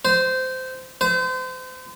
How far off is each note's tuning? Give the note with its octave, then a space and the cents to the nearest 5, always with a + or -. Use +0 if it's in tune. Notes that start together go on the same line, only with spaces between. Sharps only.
C5 -15
C5 -35